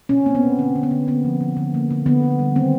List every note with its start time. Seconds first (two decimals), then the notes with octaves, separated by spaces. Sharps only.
0.09 B2 C#4
0.26 A#3 C4
0.35 B3
0.43 B2
0.59 D3 C4
0.76 D3
0.83 B3
0.91 D3
1.08 A#3 B3
1.24 F3
1.41 D3
1.57 D3
1.74 A#3
1.91 D3
2.06 D3 B3
2.23 D3
2.39 G3
2.56 D#3 C4